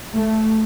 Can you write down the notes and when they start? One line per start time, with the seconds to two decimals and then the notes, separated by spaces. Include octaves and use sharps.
0.14 A3